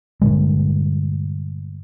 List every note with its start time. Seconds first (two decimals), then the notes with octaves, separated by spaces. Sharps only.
0.21 G2 A#2 D3 G#3